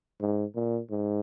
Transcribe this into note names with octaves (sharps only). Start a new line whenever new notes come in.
G#2
A#2
G#2